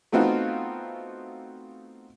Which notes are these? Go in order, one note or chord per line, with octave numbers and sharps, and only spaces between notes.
A3 B3 C4 D#4 F4 F#4